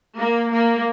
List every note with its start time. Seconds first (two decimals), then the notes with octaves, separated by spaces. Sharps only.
0.19 A#3
0.51 A#3